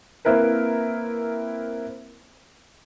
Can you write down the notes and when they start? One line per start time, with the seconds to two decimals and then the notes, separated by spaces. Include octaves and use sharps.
0.25 A#3 C4 E4 A#4 B4